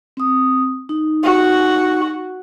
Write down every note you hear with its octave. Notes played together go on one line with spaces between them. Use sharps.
C4 D#6
D#4
F#4